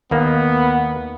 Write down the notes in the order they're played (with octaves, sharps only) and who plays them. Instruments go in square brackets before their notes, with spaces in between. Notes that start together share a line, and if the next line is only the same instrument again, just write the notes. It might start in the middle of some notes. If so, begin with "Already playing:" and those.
[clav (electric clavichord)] D#2 A#3 [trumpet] B3